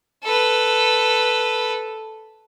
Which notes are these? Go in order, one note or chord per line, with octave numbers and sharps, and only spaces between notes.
A4 B4